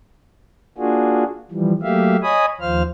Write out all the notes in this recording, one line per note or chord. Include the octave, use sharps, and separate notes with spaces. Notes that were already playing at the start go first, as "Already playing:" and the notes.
A#3 D4 F4 F#4 G#4
E3 F3 G3
F#3 A3 A#3 G4 E5 F5
C#5 D#5 G#5 B5 D#6
D#2 F3 C5 F5 F6